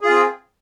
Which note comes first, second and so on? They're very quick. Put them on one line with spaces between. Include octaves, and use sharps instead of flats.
G#4 F4 C4